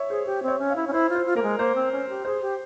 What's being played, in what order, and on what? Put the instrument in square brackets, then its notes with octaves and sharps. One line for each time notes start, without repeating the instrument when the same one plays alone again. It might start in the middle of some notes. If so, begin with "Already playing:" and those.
Already playing: [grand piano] C#5 E5
[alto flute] G#4 [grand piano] C5
[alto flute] G4 [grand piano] C5
[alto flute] C4
[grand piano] C#5
[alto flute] C#4
[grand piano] F5
[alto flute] E4
C#4
[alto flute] E4 [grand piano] C5
[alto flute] F4
[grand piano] C5
[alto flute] F4
[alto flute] A#3 [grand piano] A#4
[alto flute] G#3
[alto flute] A#3 [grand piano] C5
[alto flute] C4
C#4
G4
[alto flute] G#4 [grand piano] C5
[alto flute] G4